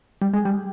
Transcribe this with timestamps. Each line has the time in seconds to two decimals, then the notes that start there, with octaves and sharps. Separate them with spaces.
0.22 G3
0.34 G#3
0.45 G3